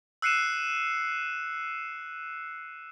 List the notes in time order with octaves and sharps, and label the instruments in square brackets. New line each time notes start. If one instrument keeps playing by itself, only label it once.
[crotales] E6 F#6 C7 C#7 D#7 E7